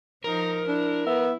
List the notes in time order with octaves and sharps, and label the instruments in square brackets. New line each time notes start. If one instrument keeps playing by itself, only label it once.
[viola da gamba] F3 D#4 [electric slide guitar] A#4
[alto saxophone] D4 [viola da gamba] E4
[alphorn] B3 [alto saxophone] E5